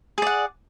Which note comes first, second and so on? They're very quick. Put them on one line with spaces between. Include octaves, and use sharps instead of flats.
G#4 D5 F#5